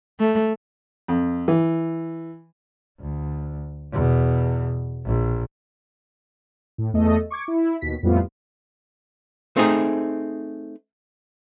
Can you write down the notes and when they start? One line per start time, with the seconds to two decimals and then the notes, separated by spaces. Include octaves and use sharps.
0.19 A3
1.08 F2
1.48 E3
3.00 D2
3.92 E2 B2
5.05 A#1
6.78 A2
6.93 E2 A3 A4 D#5
7.30 C#6 D6 G#6 C#7
7.48 E4
7.81 D#2 B2 B6
8.03 F2 A2 G3 B3 E4 F4
9.56 A3 C4 D#4 G#4